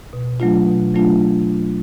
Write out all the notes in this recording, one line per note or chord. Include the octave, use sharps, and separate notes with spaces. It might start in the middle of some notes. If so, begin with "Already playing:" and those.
B2
F#3 A3 D4 F4
B2
F#3 A3 D4 F4